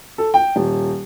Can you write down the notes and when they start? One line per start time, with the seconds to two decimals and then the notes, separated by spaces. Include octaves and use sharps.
0.18 A4
0.34 G5
0.56 D#1